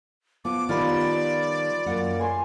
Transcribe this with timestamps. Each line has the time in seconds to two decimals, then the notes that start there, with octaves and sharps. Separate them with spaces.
0.45 F3 B3 D6
0.69 D#3 G3 B3 F4 C#5 D5 B5
1.86 F#2 A#3 F#5
2.19 G#5 C6 C#6